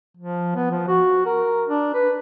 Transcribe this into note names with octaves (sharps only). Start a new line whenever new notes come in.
F3
B3
F3
F#4
A#4
D4
B4